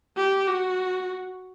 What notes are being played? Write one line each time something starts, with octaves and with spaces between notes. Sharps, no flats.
G4
F#4